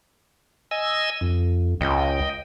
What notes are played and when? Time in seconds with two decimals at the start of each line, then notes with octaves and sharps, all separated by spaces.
0.71 D#5 G#5 E6
1.21 F2
1.81 C#2 D#5 G5